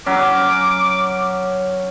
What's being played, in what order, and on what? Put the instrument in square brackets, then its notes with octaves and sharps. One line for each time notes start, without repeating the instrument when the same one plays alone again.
[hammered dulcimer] F#3 C#4 [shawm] D6